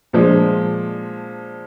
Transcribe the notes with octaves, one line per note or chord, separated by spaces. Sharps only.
A#2 F3 G#3 D4